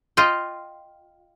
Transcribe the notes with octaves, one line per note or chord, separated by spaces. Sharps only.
F4 D#5 G5